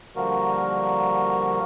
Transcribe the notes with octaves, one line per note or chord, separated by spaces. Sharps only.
D3 F3 G3 A#3 F#4 A#4